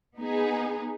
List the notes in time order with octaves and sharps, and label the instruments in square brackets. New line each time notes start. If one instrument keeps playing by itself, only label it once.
[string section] B3 D#4 G#4